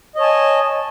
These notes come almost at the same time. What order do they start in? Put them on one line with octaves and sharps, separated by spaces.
D#5 C#5 A5 G#5